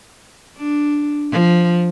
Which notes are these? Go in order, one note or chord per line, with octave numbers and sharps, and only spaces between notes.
D4
F3